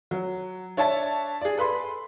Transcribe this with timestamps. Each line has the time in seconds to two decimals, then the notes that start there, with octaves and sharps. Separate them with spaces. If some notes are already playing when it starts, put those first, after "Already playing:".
0.11 F#3
0.77 D4 C#5 E5 A5
1.41 G#4 D5
1.58 A4 B4 B5 C6